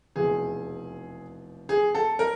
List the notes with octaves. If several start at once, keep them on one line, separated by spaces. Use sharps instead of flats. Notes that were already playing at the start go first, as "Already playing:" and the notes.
F1 E2 B2 G#4
G#4
A4
A#4